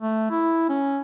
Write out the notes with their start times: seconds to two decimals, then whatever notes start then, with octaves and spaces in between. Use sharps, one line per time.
0.01 A3
0.31 E4
0.69 C#4